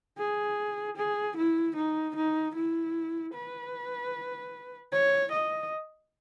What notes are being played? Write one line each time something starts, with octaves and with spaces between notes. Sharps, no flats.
G#4
G#4
E4
D#4
D#4
E4
B4
C#5
D#5